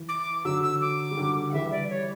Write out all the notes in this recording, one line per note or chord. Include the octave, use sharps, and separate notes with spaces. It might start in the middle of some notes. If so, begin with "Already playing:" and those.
Already playing: E3
D6
D3 F#3 E6
E6
D6
G3
D3 F#3
F#5
E3 G3 E5
D5
C#5